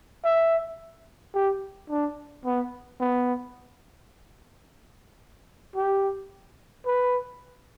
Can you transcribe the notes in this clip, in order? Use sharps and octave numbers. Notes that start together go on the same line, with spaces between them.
E5
G4
D4
B3
B3
G4
B4